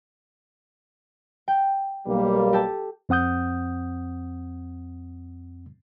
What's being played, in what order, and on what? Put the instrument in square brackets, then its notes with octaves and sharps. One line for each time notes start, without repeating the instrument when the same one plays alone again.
[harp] G5
[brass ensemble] B1 G3 A#3
[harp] G4 A4 A5
[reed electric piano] F2 C4 F#5 D#6 G6